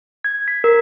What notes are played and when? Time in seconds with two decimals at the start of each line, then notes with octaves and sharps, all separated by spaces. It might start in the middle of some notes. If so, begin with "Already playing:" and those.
0.24 G#6
0.48 B6
0.64 A#4